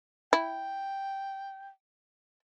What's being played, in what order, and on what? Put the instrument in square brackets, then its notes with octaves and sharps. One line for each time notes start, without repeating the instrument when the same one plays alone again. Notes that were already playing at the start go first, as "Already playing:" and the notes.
[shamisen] E4 [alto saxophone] G5